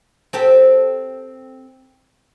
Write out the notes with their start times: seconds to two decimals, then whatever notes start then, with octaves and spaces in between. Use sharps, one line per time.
0.33 C4 G4 A4